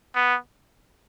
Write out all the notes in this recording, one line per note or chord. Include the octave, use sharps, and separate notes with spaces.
B3